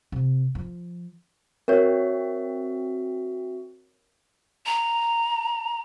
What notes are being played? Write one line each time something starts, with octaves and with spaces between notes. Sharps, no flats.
C3
F3
C4 F#4 A#4 C#5 E5
A#5